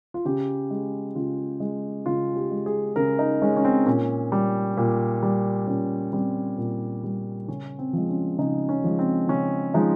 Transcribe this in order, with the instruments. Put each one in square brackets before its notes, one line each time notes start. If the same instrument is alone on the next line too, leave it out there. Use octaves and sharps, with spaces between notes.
[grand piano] F4
C#3 G4
G#3
C#3 F4
G#3
C#3 F4
G4
G#3
G#4
C#3 A#4
D#4
G#3 C#4
C#4
C4
A#2 C#4
G3
A#2
G3
A#2 C#4
G3 C4
A#2
G3
C#3 C#4
C4
F3 G#3
C#4
C#3 D#4
C#4
F3 G#3
C4
C#3 C#4
F3 G#3 D#4